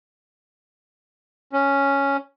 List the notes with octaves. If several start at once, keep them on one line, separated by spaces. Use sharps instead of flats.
C#4